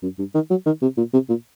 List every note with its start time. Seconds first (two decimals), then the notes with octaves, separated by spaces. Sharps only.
0.03 F#2
0.19 G2
0.35 D#3
0.50 F#3
0.66 D#3
0.82 C3
0.98 A#2
1.13 C3
1.29 A#2